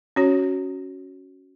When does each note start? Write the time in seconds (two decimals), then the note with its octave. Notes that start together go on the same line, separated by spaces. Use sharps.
0.16 C#4 F#4 C#5